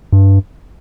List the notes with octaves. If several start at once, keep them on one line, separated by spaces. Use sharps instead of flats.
G2